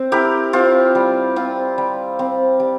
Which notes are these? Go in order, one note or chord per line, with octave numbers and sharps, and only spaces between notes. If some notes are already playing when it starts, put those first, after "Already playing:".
Already playing: C4
E4 G4 A#4
C4 F4
G3
C4 F4
G3
C4
G3